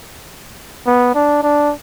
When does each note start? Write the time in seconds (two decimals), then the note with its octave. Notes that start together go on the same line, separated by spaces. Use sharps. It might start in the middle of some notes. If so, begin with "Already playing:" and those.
0.86 B3
1.15 D4
1.43 D4